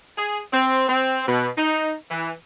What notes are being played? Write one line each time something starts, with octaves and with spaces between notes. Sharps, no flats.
G#4
C4
C4
B2
D#4
E3